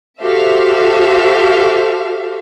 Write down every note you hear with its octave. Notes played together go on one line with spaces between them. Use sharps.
F#4 G4 A4 C5 E5 F5